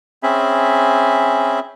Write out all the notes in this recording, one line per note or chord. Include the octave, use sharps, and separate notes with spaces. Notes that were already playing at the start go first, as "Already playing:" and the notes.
C4 C#4 G#4 E5 B5